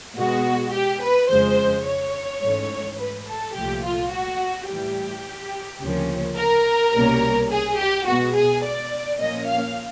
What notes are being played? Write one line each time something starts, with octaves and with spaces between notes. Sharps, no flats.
B2 G#3 B3 F#4
G4
B4
F2 C#3 F3 G#3 C5
C#5
G#2 E3 A3 C#4
B4
A4
C2 A#2 F3 A3 G4
F4
F#4
A2 E3 G3 G4
D2 C#3 F3 A#3 C#4
A#4
C2 B2 G3 A#3 C#4
G#4
G4
B2 G#3 B3 F#4
G#4
D5
A#2 F3 A#3 C#4 D#5
F5